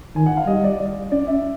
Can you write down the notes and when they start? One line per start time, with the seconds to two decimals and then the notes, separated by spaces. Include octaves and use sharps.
0.15 D#3 G#5
0.26 F#5
0.37 F5
0.47 G3 D#5
0.64 D5
0.79 D5
1.12 C#4 D5
1.27 E5